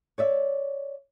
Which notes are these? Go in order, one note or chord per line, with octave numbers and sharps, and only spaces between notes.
C#5 D5 E5